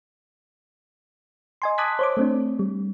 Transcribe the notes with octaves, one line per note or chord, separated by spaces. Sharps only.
D#5 G#5 C6
A5 D6 D#6 F#6 G#6 B6
C5 C#5 D6
A3 C4 D4
G3